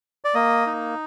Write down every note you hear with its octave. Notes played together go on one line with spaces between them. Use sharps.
D5
A#3 D#5
D#4